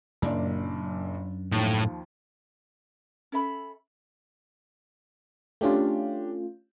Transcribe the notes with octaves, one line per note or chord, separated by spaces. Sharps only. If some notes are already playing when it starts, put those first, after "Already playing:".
F#1 F#2 A#2 D4 D5
D#2 A2 F3
C#4 A4 E5 B5
A3 C#4 D4 F4 G4